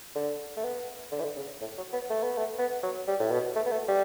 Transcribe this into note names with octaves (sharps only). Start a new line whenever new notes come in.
D3
A3
B3
D3
E3
D3
C#3
A2
F#3
B3
A3
B3
A3
B3
F#3
G3
A2
B2
A3
B3
A3
G3